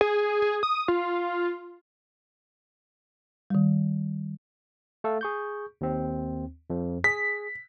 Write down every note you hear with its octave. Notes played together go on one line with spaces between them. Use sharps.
G#4
G#4
D#6
F4
D#3 G3
A3 A4 F5
G#4 C#6 G6
D#2 C4
F2 F3
G#4 B6